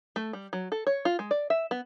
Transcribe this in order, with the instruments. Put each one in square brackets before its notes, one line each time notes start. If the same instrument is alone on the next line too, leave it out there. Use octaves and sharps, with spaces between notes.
[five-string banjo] A3
G3
F#3
A4
C#5
F4
G#3
D5
E5
B3